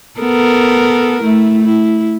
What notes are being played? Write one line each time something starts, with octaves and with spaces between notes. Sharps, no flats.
B3 A4 A#4
A3 E4
E4